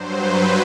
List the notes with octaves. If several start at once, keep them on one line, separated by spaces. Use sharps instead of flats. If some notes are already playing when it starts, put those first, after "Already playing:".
Already playing: G2 F#3 C5
B4